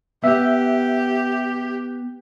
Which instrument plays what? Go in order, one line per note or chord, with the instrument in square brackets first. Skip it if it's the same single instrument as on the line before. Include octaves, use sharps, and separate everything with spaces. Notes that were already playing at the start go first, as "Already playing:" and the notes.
[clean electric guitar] B3 [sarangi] G4 [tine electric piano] E5